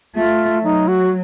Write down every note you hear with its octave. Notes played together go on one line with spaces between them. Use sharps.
A3 F4
F#3 D#4
F#4